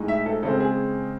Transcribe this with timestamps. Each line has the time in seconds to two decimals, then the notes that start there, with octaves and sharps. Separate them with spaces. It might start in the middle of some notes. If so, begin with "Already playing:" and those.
Already playing: A2 G#3 D#4
0.08 E5
0.26 A4
0.43 C#3 G#3 C4 A4
0.60 G#4